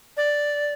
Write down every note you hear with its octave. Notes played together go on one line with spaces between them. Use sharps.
D5